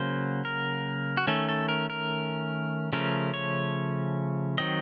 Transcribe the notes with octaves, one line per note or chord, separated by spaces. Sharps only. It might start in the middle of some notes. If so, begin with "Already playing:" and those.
Already playing: C#3 F#3 A#3 C5
A#4
F#4
D#3 A3 C#4 A4
A4
A#4
A#4
C#3 F3 A3 C#4 A#4
C#5
D#3 F#3 C4 D#5